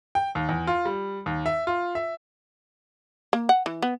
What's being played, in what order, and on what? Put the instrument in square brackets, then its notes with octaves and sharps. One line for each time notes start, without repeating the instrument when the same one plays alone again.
[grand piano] G5
D#2
E2
F4
G3
D#2
E5
F4
E5
[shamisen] A#3
F#5
E3
B3